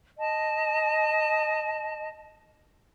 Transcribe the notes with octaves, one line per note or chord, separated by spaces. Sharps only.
D#5 A5